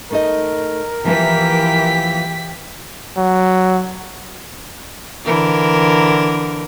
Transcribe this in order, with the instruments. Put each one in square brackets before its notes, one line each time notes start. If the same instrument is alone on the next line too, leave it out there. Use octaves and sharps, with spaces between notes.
[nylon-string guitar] A3 D#4 D#5 [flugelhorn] A#4
[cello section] E3 [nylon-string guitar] F3 A#3 B4 [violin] G4 B6
[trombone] F#3
[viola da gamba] D3 E3 A#4